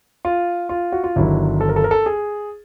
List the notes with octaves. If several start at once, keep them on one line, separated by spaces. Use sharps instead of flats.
F4
F4
F#4
F4
G1 G2 D#3 F#3 E4
A4
A#4
A4
A#4
A4
G#4